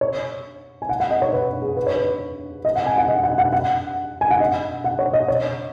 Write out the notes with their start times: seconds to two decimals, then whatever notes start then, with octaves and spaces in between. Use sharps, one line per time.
0.01 C#5
0.82 G#5
0.89 F#5
1.00 F#5
1.11 D#5
1.22 C#5
1.33 B4
1.62 G#4
1.77 B4
1.87 C#5
1.96 B4
2.65 D#5
2.75 F#5
2.86 G#5
2.98 F#5
3.08 D#5
3.23 F#5
3.38 F#5
3.53 F#5
4.21 G#5
4.31 F#5
4.40 D#5
4.84 F#5
4.99 C#5
5.13 D#5
5.28 C#5